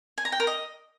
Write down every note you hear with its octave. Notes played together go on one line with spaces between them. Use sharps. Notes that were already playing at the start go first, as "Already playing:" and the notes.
G#5
A#5
G5
A#4
D#5